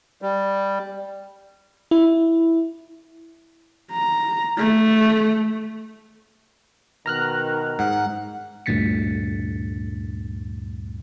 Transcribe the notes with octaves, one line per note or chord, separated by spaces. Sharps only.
G3
E4
A#5
A3
B2 D#3 A#5 F6 F#6
G#2 F#5
D2 G2 A#2 A6 B6 C#7